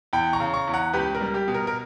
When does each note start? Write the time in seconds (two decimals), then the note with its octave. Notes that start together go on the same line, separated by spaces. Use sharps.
0.13 E2 G5 B5
0.33 A#5 C#6
0.40 C#3
0.54 A#5 C#6
0.68 E2
0.74 F#5 A#5
0.93 C#2 G4 B4
1.15 A#4
1.21 G3
1.34 G4
1.48 B2
1.54 A#4
1.67 A#4